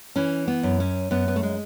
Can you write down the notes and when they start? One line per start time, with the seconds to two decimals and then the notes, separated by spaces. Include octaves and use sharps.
0.16 E3 C#4
0.48 B3
0.63 F#2
0.80 C#4
1.11 F#2 B3
1.28 B3
1.36 A3
1.43 G#3